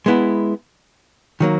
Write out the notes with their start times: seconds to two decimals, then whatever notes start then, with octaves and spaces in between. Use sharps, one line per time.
0.06 G#3 B3 E4
1.40 D#3 F#3 A#3